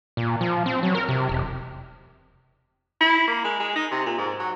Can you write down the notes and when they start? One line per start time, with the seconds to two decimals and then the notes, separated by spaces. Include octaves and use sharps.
0.17 A#2
0.41 F3
0.66 C4
0.83 F#3
0.95 A#4
1.09 C3
1.29 E1
3.00 E4
3.28 A#3
3.44 G#3
3.60 G#3
3.76 D#4
3.91 C3
4.06 A#2
4.18 G#2
4.39 F#3